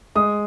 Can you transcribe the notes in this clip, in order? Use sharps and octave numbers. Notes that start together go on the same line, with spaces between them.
G#3 D#6